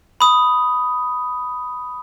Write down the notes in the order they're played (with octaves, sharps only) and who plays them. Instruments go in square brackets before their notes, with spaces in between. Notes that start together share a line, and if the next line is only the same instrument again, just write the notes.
[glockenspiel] B5 D#6